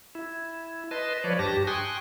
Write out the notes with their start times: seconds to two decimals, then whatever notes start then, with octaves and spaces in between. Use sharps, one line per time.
0.15 E4
0.91 B4 D#5 A5 C6
1.24 F3 B4 C#5 D5
1.39 G2 G4 A5 A#6
1.67 G5 G#5 C6 C#6 D#6 F#6